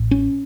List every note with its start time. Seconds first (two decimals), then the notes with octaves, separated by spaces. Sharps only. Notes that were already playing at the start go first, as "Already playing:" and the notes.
Already playing: A1 A2
0.11 C#4